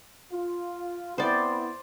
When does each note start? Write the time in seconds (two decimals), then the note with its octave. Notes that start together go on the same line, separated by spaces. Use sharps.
0.32 F4
1.18 B3 C4 E4 C5 D5